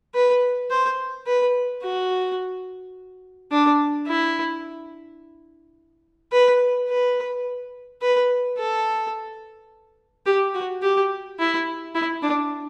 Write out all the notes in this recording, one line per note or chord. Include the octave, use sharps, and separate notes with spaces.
B4
C5
B4
F#4
D4
E4
B4
B4
B4
A4
G4
F#4
G4
E4
E4
D4